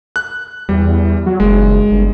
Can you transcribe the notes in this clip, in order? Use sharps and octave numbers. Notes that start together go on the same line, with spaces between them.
F#6
E2 G3
F#3
F#1 G#3
G1